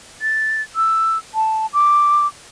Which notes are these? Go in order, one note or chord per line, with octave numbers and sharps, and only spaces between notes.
A6
E6
A5
D6